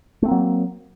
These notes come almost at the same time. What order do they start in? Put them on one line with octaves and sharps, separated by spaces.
A3 C4 A#3 F#3